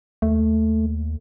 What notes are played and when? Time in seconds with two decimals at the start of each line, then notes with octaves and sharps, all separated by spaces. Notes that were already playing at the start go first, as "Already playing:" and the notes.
0.22 D#2 A3